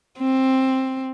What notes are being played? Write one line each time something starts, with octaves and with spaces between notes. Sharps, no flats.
C4